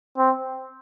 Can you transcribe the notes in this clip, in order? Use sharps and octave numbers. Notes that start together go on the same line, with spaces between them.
C4